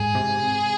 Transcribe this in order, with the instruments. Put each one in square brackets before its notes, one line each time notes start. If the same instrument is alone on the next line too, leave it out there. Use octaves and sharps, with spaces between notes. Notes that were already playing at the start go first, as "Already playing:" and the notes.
Already playing: [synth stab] G#2 [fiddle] G#4
[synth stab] C3